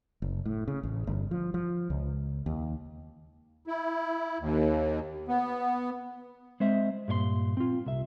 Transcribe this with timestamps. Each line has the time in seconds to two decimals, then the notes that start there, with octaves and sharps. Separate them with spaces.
0.22 F#1
0.45 A2
0.68 C#3
0.83 A1
1.07 G1
1.31 F3
1.54 F3
1.90 C#2
2.46 D#2
3.67 E4
4.40 D#2
5.28 B3
6.60 G#3 C4 C5 E5
7.08 G2 A#2 C#5 C6
7.57 C4 F4
7.86 C2 E5